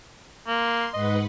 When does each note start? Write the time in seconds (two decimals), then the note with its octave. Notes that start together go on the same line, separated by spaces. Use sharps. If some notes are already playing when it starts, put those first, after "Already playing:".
0.47 A#3 C6
0.94 G#2 B4 D#5 F#5